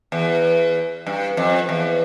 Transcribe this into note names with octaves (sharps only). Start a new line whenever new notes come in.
E2
G2
F2
E2